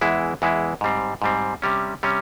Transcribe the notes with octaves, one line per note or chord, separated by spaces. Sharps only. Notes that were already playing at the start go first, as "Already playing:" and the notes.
E2 E3 G#3 E4
E2 E3 G#3 E4
G#2 G3 C4
G#2 G3 C4
C3 G3 C#4
C3 G3 C#4